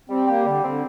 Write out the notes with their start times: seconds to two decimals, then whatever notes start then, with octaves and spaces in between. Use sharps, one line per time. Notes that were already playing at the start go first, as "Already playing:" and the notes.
0.09 G3 C4
0.27 A#3 G4
0.45 D3 G3
0.63 D3 C4